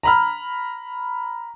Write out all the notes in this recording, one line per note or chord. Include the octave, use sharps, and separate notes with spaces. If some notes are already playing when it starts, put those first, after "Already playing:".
A#5 B5 F6